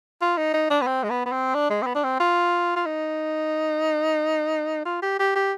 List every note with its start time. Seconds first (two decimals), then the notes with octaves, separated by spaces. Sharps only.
0.22 F4
0.38 D#4
0.54 D#4
0.71 D4
0.82 B3
0.87 C4
1.04 G#3
1.10 B3
1.26 B3
1.32 C4
1.55 D4
1.70 G#3
1.82 C4
1.87 B3
1.96 D4
2.04 C4
2.20 F4
2.76 F4
2.86 D#4
4.85 F4
5.02 G4
5.20 G4
5.36 G4